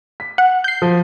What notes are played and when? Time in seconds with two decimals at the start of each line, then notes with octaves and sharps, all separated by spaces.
0.20 B6
0.38 F#5
0.64 G6 C7
0.82 F3